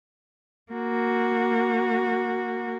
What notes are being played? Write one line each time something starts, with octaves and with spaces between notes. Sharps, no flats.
A#3 F#4